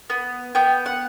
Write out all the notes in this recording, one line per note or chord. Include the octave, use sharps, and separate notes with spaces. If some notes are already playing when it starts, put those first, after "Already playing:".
B3
B3 G5
F#5